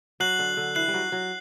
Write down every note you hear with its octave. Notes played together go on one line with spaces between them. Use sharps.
F#3 F#6 C7 F#7
D3
D3
E3 F#6 C7 F#7
G3
F#3
F#3